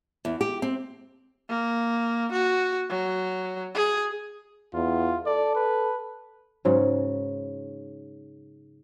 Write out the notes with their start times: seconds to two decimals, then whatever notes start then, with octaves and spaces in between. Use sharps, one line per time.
0.25 E2
0.41 G4
0.62 C4
1.49 A#3
2.32 F#4
2.90 F#3
3.75 G#4
4.74 E2 F4
5.26 A4 D5
5.55 B4
6.65 G#2 C#3 F#3